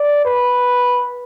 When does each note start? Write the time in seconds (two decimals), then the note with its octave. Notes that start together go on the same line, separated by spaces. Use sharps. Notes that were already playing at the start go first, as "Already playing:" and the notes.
Already playing: D5
0.25 B4